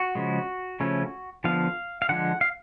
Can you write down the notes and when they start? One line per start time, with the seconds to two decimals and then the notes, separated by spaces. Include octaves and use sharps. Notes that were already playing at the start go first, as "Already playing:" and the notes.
Already playing: F#4
0.15 C#3 F3 G#3
0.80 C#3 F3 A3 C#4
1.44 D3 F3 B3 F5
2.02 F5
2.09 D3 F3 G#3 F#5
2.41 F5